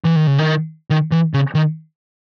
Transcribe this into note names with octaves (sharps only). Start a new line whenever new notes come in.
E3
D#3
C#3
D#3
D#3
E3
C#3
D#3